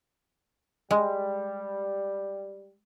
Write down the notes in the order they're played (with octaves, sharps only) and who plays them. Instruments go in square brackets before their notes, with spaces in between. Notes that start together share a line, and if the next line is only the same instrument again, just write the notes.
[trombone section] G3 [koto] G#3